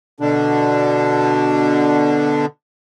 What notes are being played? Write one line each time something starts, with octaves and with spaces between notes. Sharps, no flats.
B2 D3 D4